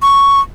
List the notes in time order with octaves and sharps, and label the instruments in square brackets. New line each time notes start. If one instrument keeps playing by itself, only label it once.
[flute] C#6